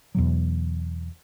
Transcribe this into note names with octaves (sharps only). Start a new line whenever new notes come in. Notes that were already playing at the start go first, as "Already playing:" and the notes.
E2 B2 F#3